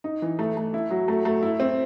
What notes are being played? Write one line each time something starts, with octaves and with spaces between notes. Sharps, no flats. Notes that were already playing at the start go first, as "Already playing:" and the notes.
D#4
E3
A3
A3
E4
F#3
A3
A3
E4
C4